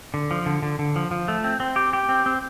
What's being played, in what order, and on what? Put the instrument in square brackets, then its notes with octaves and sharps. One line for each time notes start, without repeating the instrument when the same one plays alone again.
[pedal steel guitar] D3
F3
D3
D3
D3
F3
F3
A3
C4
C4
G4
G4
C4
C4